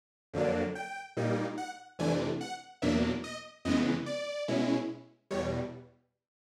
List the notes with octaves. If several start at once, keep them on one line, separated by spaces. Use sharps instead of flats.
F2 D3 F#3 A#3 D4
G5
A#2 G3 A#3 D#4
F#5
F2 C3 E3 A3 D4 G#5
F#5
E2 B2 F#3 A#3 D4 E5
D#5
F2 C#3 E3 G#3 B3 D#5
D5
B2 G#3 C#4 E4
E2 B2 G3 C#5